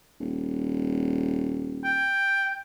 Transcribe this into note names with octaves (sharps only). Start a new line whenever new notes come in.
D#1
G5